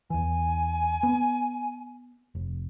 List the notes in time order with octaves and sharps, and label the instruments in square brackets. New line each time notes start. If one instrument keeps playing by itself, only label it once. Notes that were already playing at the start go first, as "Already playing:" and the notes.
[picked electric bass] E2 E3 [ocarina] G#5
[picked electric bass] B3
F1